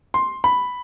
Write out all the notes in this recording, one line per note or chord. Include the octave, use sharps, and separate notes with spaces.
C6
B5